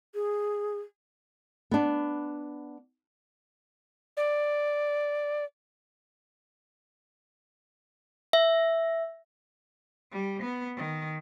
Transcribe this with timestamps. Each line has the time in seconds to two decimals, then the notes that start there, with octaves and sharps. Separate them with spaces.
0.15 G#4
1.71 B3 D4
4.17 D5
8.33 E5
10.11 G3
10.42 B3
10.77 D#3